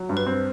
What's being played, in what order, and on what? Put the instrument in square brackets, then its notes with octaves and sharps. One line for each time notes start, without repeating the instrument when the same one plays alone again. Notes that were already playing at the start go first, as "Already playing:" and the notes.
Already playing: [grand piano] F#3
G2
[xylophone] B4
[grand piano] C4